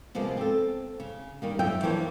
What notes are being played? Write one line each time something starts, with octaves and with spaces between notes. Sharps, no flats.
C3 F3 G#3 A#3 B3
C4 A4
C#3
D#3 G3 A#3
F#2 F#3 F4 E5 G5
E3 F3 A#3 D4 C#5